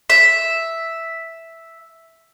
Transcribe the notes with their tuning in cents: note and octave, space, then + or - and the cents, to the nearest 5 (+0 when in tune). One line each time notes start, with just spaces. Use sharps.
E5 +0